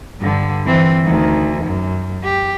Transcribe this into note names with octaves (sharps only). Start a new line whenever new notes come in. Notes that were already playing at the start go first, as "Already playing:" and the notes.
G2 D3
E3 C4
D2 D#3
F#2
G4